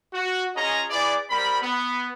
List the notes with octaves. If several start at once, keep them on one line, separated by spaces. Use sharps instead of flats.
F#4
C#4 F4 G#4 C#5 D#5 A#5
E4 G#4 B4 D5
G3 C4 A#4 B5
B3